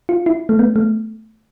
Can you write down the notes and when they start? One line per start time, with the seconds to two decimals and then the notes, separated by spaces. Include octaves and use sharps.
0.09 F4
0.26 E4
0.49 A3
0.59 B3
0.76 A3